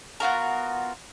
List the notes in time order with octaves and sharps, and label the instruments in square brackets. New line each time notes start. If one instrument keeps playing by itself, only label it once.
[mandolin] B3 F4 F#4 A#4